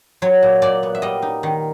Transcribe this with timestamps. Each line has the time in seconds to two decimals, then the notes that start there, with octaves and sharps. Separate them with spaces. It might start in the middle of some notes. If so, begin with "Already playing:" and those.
0.22 F#3 C#5
0.42 A#2
0.62 A#2 D5
0.83 B3
0.95 E5
1.02 G3 D#5
1.22 D#4
1.43 D#3